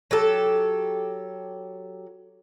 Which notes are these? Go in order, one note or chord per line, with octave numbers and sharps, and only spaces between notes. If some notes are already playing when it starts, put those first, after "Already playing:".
F#3 G4 A4